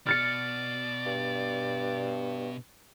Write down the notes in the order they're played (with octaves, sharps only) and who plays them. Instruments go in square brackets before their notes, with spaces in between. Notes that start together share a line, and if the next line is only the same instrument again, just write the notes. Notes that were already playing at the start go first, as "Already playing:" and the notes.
[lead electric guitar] B2 [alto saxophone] D5 [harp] F6 A6 C#7
[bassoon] G2